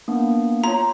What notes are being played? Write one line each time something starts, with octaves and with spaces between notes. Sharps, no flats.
A#3 B3 D4
F4 C#5 A#5